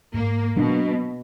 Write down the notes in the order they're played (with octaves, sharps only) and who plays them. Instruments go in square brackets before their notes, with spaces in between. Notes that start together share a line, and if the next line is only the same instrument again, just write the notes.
[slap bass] G#2 [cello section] A#3
[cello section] B2 [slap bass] F#3 D4